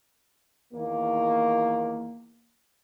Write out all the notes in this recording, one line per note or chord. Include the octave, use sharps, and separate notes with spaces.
E2 D#3 A#3